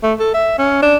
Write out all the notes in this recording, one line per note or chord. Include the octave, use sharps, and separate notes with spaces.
A3
A4
E5
C#4
D4